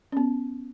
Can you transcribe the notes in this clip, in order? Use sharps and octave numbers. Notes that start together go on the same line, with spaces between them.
C#4
B3